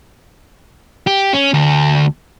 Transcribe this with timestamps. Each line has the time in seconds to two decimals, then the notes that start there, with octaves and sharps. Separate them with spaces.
1.07 G4
1.33 C#4
1.54 D2